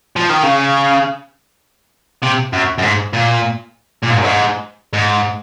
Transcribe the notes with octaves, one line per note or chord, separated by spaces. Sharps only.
F3
D#3
C#3
C3
F#2
F#2
G#2
A#2
A#2
G#2
F#2
G#2
G#2